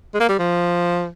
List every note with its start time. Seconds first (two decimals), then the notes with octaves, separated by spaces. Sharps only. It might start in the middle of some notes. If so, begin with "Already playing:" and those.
0.14 G#3
0.20 A#3
0.29 G3
0.39 F3